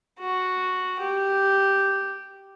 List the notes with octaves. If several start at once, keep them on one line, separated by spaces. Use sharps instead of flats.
F#4
G4